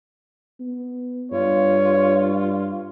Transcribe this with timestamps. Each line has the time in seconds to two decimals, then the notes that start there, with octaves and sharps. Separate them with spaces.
0.60 B3
1.32 G2 F4 C#5